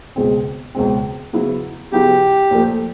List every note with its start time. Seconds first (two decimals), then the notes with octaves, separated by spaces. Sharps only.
0.16 C#2 B2 G#3 C4
0.75 C#2 B2 G#3 C4
1.33 C#3 F#3 B3 E4
1.92 C#3 F#3 B3 E4 G4
2.51 A#2 F3 A3